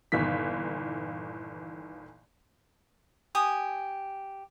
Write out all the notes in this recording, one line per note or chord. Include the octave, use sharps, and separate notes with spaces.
G1 A#2 D#3 E3 B6
G4 G#5 D#6